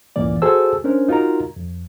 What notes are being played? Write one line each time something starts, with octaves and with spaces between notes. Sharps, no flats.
C#2 F#2 A2 E3 A#3 D5
F#4 G#4 A4 C5 A5 E6
C#4 D4 A#4 C5
D#4 F4 F#4 A#4 A#5
F2